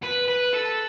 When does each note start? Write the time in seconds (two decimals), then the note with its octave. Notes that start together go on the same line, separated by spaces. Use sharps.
0.03 B4
0.28 B4
0.53 A4